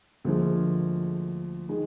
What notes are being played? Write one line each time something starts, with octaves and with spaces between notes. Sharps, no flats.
D2 D3 F3 G#3 A#3
D#3 G#3